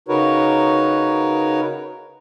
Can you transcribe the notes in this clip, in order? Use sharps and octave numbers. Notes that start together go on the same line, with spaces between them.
C#3 D#4 F#4 A#4 B4 C#5